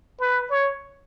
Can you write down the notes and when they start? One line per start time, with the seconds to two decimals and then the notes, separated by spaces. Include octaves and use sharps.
0.20 B4
0.50 C#5